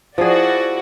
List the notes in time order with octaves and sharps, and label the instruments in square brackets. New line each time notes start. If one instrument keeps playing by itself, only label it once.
[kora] F3 G#4 [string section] E4 F#4 D5